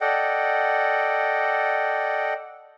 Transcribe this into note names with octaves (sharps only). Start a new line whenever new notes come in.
A4 D5 D#5 F#5 G5